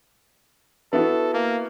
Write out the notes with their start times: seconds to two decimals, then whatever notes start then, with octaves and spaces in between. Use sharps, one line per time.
0.93 B3 E4 F#4 A4
1.34 A#3